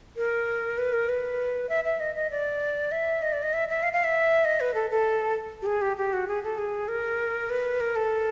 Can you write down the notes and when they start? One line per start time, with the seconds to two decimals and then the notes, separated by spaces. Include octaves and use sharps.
0.17 A#4
0.78 B4
0.93 A#4
1.09 B4
1.69 E5
1.84 E5
2.00 D#5
2.15 D#5
2.31 D5
2.92 E5
3.22 D#5
3.33 D5
3.43 D#5
3.53 E5
3.69 E5
3.83 F5
3.93 F5
4.04 E5
4.45 D#5
4.60 B4
4.74 A4
4.90 A4
5.62 G4
5.66 G#4
5.82 G4
5.97 G4
6.13 F#4
6.28 G#4
6.43 A4
6.58 G#4
6.88 A#4
7.50 B4
7.80 A#4
7.96 A4